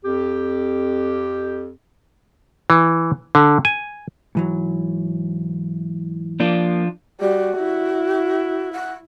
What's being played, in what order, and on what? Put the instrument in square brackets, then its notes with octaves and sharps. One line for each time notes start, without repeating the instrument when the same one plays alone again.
[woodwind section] F2 G4
[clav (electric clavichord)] E3
D3
G#5
[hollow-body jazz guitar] G#2 E3 F#3
[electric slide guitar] F3 D4 F4 [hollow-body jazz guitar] A#3 D5
[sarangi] G3 [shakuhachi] F#4
[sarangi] E4
[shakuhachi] F#5